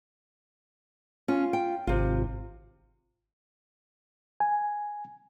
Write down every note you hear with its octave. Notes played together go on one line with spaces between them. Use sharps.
C#4 F4
G5
G#1 C3 F4
G#5